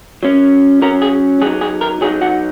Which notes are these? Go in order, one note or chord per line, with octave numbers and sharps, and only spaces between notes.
F#3 C#4
F#3 C#4 A#4
G#4
F#3 D#4 G#4
G#4
A#4
F#3 D#4 G#4
F#4